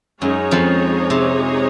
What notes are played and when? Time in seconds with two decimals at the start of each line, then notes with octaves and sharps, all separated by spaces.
0.22 F#2 G#3 D#4 G#4 C#5
0.51 F2 F3
1.10 C3